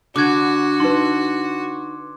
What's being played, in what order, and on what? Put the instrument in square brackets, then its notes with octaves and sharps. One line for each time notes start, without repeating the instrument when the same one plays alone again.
[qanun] D3 [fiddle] F#4 [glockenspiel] D6 F#6 G#6
[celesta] D#4 B4 [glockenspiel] C6